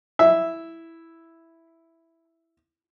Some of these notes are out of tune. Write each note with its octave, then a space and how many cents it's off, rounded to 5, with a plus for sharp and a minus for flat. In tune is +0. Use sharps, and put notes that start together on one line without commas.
E4 +0 E5 +0